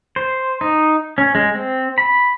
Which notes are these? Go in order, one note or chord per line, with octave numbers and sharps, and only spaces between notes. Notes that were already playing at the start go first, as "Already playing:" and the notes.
C5
D#4
C#4
G#3
C4
B5